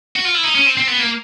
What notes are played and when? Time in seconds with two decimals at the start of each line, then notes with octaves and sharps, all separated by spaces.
0.16 F#4
0.25 F4
0.35 E4
0.44 D#4
0.55 C#4
0.66 C4
0.77 C4
0.88 B3
0.99 A#3